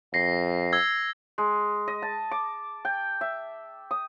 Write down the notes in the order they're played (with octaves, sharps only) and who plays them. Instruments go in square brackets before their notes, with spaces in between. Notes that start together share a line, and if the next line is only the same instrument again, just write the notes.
[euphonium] F2 [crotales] A#6 C7
[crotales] E6 G#6
[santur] G#3
D#5
A5
D6
G5
E5
D#6